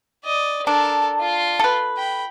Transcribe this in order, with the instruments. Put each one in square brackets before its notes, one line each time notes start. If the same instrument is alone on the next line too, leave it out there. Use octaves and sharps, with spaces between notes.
[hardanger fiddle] D5 D#5
[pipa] D4 [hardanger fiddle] A4 A#4
[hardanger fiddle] F4 C6
[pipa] A4 B4
[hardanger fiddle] G5 B5